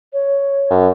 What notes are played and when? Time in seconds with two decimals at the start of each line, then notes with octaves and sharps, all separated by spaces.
0.13 C#5
0.70 F#2